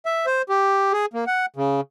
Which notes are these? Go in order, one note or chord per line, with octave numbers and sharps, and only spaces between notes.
E5
C5
G4
G#4
A#3
F#5
C#3